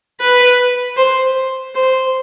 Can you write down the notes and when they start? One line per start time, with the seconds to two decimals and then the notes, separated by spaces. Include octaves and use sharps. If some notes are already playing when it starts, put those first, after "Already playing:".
0.20 B4
0.97 C5
1.75 C5